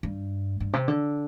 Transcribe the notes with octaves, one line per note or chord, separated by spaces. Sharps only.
G2
G2
C3
D3